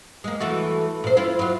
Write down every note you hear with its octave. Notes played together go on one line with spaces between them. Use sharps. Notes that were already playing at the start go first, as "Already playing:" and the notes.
G#3 A#3
E3 A3 F#4
A#2 C5
E4 F4
F#3 F4